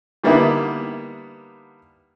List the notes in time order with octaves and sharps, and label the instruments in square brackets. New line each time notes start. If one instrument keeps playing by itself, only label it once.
[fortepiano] D3 G3 A#3 B3 D#4 E4